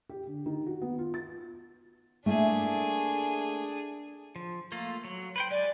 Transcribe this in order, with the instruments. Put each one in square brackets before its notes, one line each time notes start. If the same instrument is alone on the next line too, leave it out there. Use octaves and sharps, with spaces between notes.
[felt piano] G4
D3
D#3
F#4
B3
F4
A6
[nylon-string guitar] A3 A#3 E4 [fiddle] D4 G#4
[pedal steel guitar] F3
A3 A#3 F4
F#3
B4 C5 G5
[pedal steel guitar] G#3 G#5 [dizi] D5